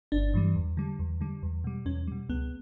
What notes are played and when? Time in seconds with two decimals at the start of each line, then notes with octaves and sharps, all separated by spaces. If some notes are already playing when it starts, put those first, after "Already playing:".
0.12 G1 D4
0.34 G2 E3 G3
0.56 E2
0.77 D3 G3
0.99 E2
1.21 D3 G3
1.43 E2
1.64 B2 G3
1.85 E2 C#4
2.07 B2 G3
2.29 C#2 B3